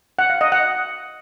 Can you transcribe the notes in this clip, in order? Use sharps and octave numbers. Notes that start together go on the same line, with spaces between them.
F#5
F5
D#5
F#5